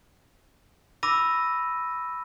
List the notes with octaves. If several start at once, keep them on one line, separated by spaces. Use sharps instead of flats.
B5 D6 E6 A#6 D#7